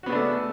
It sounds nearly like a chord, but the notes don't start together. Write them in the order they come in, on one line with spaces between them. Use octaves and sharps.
F#4 B3 C#3 D4 A3